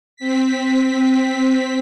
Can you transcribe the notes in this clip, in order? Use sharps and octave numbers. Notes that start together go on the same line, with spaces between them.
C4 B6